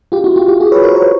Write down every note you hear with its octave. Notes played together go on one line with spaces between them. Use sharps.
F4 G4
E4 F#4
F4 G4
F4 G4
F#4 G#4
B4 C#5
A#4 C5
B4 C#5